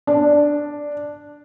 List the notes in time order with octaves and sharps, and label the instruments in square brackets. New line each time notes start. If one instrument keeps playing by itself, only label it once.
[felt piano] D4